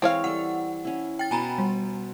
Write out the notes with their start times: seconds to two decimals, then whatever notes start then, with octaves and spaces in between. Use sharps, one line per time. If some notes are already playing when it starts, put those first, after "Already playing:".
0.02 E3 G#3 C4 A#4 C#5 F5
0.24 G3 A4 F#5
0.85 C#4 E4
1.19 G5 A6
1.31 B2 D#5 G#5 A#5 B5
1.58 G3